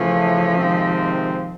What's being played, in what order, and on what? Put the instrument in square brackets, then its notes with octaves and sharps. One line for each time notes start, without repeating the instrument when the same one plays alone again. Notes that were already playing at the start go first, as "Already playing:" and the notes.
Already playing: [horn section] C#3 E3 A3 C#4 [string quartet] F3
[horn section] C3 D#3 G#3 C4